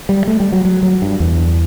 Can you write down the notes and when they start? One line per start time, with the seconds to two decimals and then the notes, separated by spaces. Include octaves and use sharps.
0.09 G3
0.27 A3
0.40 G3
0.52 F#3
0.65 F#3
0.83 F#3
1.02 G2
1.20 E2